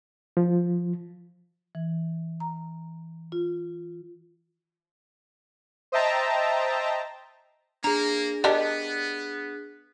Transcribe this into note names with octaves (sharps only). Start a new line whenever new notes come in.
F3
E3
A#5
F4
C5 D#5 E5 G5 A5 A#5
A#3 D4 G#4 A#5
B3 G4 A#4 D5 D#5 A5